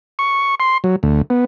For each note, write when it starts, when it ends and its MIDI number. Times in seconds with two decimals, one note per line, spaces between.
0.19 0.55 85
0.60 0.78 84
0.84 0.96 54
1.03 1.22 38
1.30 1.45 59